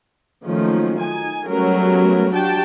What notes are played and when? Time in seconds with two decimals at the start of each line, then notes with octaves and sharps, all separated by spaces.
0.45 D#3 F3 F#3 A3 A#3 C#4
1.00 D#4 G#5
1.47 F#3 G3 A3 B3 C#4 A#4
2.34 D4 F#4 G4 G5 A5